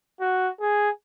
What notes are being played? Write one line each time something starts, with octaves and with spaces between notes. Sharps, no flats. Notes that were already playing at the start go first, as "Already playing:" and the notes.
F#4
G#4